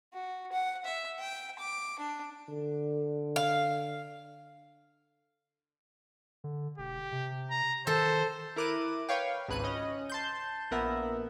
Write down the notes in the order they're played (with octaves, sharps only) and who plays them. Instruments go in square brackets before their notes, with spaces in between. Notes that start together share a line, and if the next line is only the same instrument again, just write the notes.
[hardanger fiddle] F#4
F#5
E5
G5
D6
D4
[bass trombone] D3
[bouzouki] F5
[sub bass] D3
[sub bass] E1 [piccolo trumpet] G4
[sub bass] C3
[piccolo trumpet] A#5
[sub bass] D#3 [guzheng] A4 [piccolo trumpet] C5
[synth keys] E4 A#4 D6 F#6 D#7
B4 C#5 F5 G5
G#1 C#2 B4 F#6 D#7
C#4 D#5
A5 C6 G6
A#1 B3 A#4 E5 F#5